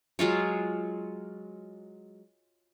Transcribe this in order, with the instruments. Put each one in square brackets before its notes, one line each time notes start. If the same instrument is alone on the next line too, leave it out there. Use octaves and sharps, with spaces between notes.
[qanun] F#3 G#3 F4 C#5